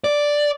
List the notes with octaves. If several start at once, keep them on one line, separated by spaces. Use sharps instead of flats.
D5